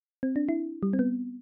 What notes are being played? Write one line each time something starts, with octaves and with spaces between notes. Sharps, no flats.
C4
D4
E4
G3
C4
B3